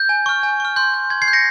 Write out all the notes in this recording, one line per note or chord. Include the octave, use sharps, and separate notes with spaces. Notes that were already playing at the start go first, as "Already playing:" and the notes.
Already playing: G6
G#5
C#6 F6
G#5
C#6 F6
C6 G6
G6
C6 G#6
G#6 C7
G6
A#6 C#7